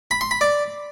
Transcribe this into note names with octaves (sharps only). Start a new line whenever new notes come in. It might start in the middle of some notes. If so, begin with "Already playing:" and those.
B5
C6
B5
D5